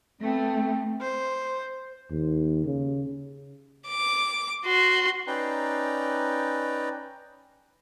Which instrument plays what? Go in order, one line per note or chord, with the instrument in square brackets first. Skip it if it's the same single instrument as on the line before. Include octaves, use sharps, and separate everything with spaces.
[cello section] A3 B3 [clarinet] C4
[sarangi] C5
[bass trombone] D#2
C#3
[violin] D6
F#4 C6
[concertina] C#4 D#4 B4 D5 G5 A#5